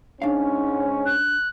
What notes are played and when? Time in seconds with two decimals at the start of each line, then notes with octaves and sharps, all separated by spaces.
0.22 G#2 C#4 D4 F5
1.06 F#6